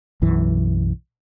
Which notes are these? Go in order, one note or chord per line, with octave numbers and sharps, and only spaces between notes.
B1 F#2 E3